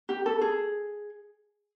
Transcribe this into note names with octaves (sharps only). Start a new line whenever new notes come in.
G4
A4
G#4